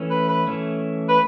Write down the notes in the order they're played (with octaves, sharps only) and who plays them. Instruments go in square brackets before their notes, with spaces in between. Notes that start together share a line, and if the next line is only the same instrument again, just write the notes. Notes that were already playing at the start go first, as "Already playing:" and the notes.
Already playing: [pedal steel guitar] E3 A3 C#4
[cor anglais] B4
B4
[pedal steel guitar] E3 A3 C#4
[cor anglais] B4